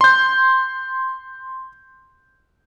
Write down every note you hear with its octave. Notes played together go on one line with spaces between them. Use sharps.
C6 G6